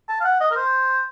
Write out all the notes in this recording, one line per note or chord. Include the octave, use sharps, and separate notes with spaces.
A5
F5
F#5
D#5
A#4
C5